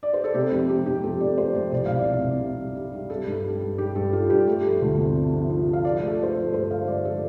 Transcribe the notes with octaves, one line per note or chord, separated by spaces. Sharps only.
D5
C5
A4
C3 G4
F2 G4
F2 G4
F2 G4
F2 A4
F2 D5
A3 C5
F2 G4
C2 D5
C2 F5
D5
C3
C2
G3
G3
G3
G3
G3 A4
G2
G3
G3
G3 G4
G2 A4
G3 F4
G2 G4
A3 A4
F3
D2
C3
C3
F3
F3
F3
F5
F3 D5
A3
A4
A3 C5
A4
F3
G2 C5
A3 F5
G2 D5
F3 A4